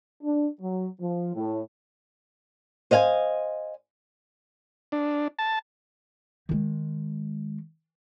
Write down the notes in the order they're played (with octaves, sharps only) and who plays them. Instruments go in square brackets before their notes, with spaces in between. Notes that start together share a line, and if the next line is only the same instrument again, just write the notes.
[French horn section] D4
F#3
F3
A2
[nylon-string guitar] C5 D#5 F5 G5 G#5
[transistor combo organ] D4
A5
[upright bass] D#3 G#3